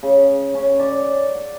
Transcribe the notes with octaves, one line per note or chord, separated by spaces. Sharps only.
C#3
C#4
D5
F#5